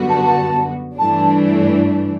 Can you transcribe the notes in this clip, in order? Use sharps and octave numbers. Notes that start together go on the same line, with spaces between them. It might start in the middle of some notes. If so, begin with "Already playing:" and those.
Already playing: F#2 D3 G3 B3 F#4
A5
A5
G2 E3 A3 D4 A5